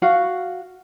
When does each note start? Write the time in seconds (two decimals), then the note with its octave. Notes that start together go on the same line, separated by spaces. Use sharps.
0.02 F#4 F5 F#5